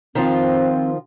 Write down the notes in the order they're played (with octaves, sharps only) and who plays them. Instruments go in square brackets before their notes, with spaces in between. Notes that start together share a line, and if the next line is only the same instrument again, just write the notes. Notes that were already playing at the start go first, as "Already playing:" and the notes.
[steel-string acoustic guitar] D#3 F3 F4 [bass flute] C4